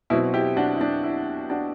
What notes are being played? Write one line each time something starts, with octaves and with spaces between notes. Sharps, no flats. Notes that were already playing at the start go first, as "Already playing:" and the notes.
B2 F#3 C4 E4
E4 G4
D4 F#4
E4
D4
E4
D4 F#4